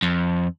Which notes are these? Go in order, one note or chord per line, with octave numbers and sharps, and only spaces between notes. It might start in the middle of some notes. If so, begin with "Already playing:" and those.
F2